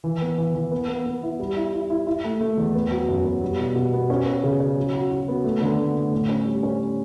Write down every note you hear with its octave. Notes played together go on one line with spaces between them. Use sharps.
E3
B3
E3
E3
B3
B3
B3
E4
G3
E4
E4
E4
E4
A3
A3
E2
B3
F#3
F#2
B3
G3
B2
B2
B3
C#4
C#4
C#3
C#4
F#3
F#4
F#4
B3
A3
D3
A3
A3
A2
C#4
G3
C#4